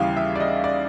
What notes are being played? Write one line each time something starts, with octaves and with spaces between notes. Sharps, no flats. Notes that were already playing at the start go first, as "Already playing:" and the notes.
Already playing: D#2 C#3 E3 G3 F5
E5
D5
D#5
D5